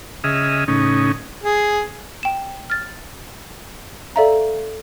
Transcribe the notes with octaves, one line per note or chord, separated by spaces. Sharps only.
C#3 G#4 D#5 E5 F6
A2 C#3 C#4 D#4
G#4
G5 E7
F6 A6
A4 D5 E5 F5 A#5